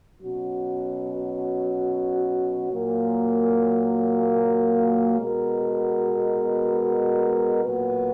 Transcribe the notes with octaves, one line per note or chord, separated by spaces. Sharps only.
B2 F#3 C#4 F#4
A#2 F#3 A#3
B2 G#3 B3 F#4 A#4
A#2 F#3 B3 F#4 B4